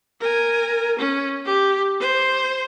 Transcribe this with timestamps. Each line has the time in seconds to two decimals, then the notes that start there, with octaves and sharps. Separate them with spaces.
0.20 A#4 G#5
0.99 C#4
1.45 G4
2.00 C5